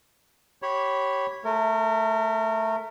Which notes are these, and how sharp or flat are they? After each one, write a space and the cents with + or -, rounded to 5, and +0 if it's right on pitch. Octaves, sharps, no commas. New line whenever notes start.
G4 -25 C#5 -10 B5 +0
A3 +0 A#4 -30